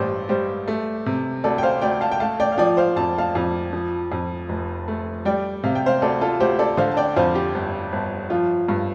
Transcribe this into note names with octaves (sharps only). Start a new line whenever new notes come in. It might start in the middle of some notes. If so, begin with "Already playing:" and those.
Already playing: A1 G2 G4 C5 D5
G3 G4 C5
A3
C3
D2 A4 D5
G5
C5 F5
D2 D5 G5
F5 A5
G5
A3 F5 A5
D5 G5
F5
F3 D5 G5
C5 F5
F2 A5
F5 A5
F2
F3
F2
F1
A3
G3 D5 G5
C3 F5
G5
C5 F5
D2 A4 D5
F4 A4
D2 G4 C5
A4 D5
D3 C5 F5
A5
D5 G5
F2 C5 F5
G4
G1
G1
F3 F4
G2